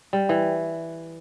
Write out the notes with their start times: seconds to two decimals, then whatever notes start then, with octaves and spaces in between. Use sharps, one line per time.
0.13 G3
0.29 E3